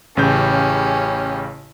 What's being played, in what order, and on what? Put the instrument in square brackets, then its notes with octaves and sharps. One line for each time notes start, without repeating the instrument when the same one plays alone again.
[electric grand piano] A1 C#3 G6 [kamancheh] C#4 G4